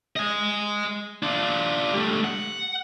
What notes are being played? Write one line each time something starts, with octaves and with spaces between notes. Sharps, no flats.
D#5 G#5
D4 F4
G3 A3
F#5